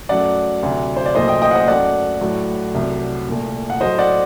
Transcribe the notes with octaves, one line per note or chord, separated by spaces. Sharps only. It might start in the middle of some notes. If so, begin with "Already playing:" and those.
F#2 F#3 A3 D5 F#5
D2 C3 F#3
C5
D5
C2 A#2 F#3 A3 C5 D#5
D#5 G5
D#5 G5
F#5
C5 D#5
F#2 F#3 A3 D5 F#5
A2 F#3 A3
C2 C3 F#3 A3
C2 A#2 A3
F#5
A2 F#3 A3 C5 D#5
D5 F#5